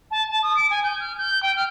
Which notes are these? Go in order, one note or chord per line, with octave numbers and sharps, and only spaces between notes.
A5
A5
D#6
D7
G#5
G6
F6
G6
G5
F6